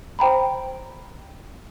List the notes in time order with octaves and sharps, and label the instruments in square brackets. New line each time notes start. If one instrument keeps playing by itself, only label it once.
[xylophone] C5 G5 A#5 B5